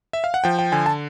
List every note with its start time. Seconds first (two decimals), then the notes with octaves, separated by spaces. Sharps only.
0.13 E5
0.24 F5
0.34 F#5
0.44 F3 G5
0.59 G5
0.72 D3 G#5
0.86 A5